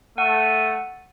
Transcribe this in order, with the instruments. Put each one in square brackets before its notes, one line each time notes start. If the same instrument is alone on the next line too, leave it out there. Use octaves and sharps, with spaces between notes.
[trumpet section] A3 [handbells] F#5 [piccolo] D#7